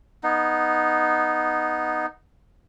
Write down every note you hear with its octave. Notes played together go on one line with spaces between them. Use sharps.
B3 D#4